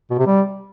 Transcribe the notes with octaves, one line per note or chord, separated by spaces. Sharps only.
B2
C3
G3